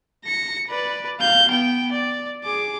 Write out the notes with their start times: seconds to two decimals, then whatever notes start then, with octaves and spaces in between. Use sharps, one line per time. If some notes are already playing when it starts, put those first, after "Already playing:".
0.25 A#6 C#7
0.68 B4 D5
1.20 F5 G6
1.50 B3 G5
1.92 D5
2.44 G#4 D6